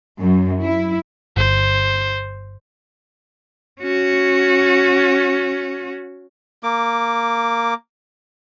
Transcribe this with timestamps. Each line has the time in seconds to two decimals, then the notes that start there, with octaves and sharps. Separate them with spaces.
0.20 F#2
0.61 E4
1.37 G1 C5
3.81 C#4 F#4
6.63 A#3 D6